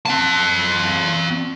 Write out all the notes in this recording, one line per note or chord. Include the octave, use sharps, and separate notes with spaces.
C4 A5